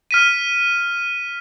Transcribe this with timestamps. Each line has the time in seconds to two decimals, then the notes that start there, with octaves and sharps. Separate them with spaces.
0.11 F6 B6 D#7